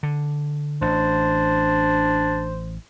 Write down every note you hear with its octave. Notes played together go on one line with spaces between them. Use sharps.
D3
A1 D4 C5